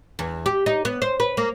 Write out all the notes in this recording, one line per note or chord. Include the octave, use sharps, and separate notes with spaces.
E2
G4
D#4
B3
C5
B4
A#3